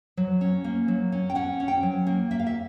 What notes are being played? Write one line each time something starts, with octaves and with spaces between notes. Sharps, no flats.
F#3
C#4
A#3
F#3
C#4
G5
C#4 F#5
C#4
G5
F#3
A#3
A#3 E5
F5
E5